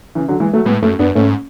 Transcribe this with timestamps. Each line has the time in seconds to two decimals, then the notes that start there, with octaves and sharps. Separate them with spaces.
0.15 C#3 E3
0.28 D3 F#3
0.40 E3 G#3
0.53 F#3 A3
0.65 A2 G#3 B3
0.82 F#2 A3 C#4
0.99 F#2 B3 D4
1.15 G#2 A3 C#4